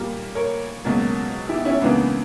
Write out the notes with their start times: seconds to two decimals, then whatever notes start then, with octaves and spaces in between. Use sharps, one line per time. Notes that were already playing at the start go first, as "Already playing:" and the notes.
Already playing: A#2 G3 A#3
0.35 A#4 C#5
0.85 C#2 B2 F#3 A#3
1.49 E4 G4
1.65 C#4 E4
1.82 C#2 C#3 E3 A#3 B3 D4